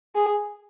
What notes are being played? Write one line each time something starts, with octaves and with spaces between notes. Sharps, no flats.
G#4